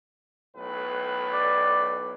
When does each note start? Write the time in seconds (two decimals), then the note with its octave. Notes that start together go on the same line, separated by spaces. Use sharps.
0.56 B1 A2 B4
1.34 D5